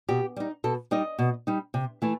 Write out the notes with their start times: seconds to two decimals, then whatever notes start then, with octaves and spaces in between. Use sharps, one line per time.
0.09 B2 G4
0.36 G3 D#4
0.64 B2 A4
0.91 G3 D#4 D#5
1.19 B2
1.47 G3 D#4
1.74 C3
2.02 E3 A3 E4